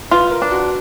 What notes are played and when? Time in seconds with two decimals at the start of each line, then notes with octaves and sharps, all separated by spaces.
0.11 F4 B4
0.31 A#4
0.42 D4
0.51 F#4